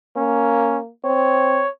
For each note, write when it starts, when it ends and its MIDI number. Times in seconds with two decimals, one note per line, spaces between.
0.17 0.90 58
0.17 0.78 61
1.05 1.63 60
1.05 1.69 73